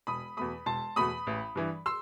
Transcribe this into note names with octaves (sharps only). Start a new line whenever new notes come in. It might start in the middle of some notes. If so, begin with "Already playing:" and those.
E1 B5 D#6
E2 B2 A3 B5 D#6
E1 A5 C6
E2 B2 A3 B5 D#6
A1
G2 E3
C6 E6